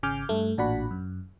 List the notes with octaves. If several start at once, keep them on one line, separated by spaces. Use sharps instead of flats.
G#1 C#3 G#5 D6 F6 G6
G2 A3
A1 A#2 D4 F#4 F#5 B5
F#2